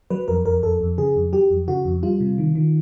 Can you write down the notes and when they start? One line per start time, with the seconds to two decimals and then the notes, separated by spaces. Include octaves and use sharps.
0.10 F#3 B4
0.28 F2 A#4
0.45 F2 A#4
0.63 F2 A4
0.81 F2
0.98 C#3 G#4
1.15 F2
1.33 F#3 G4
1.51 F2
1.68 C#3 F#4
1.85 F2
2.03 G3 F4
2.20 C3
2.38 D#3
2.55 D#3